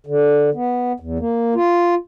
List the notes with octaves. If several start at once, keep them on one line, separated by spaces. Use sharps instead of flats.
D3
B3
E2
A#3
F4